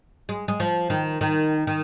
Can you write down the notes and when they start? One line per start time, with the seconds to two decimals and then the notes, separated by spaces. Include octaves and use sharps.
0.29 G#3
0.48 G#3
0.60 F3
0.90 D#3
1.21 D#3
1.67 D#3